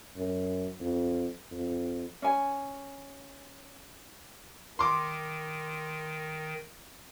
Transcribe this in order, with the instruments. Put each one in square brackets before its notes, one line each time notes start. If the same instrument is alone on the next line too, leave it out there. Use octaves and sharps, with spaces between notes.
[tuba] F#2
F2
F2
[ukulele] C#4 G#5
[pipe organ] D#3 [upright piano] C6 D6